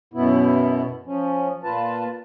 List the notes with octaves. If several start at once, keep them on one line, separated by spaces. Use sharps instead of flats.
F#2 B2 B3 E4
F3 C#4
A#2 F4 B4 A5